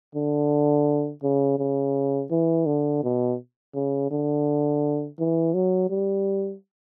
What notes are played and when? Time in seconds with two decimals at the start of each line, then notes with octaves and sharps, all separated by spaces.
0.15 D3
1.23 C#3
1.59 C#3
2.31 E3
2.66 D3
3.03 B2
3.75 C#3
4.11 D3
5.19 E3
5.54 F#3
5.90 G3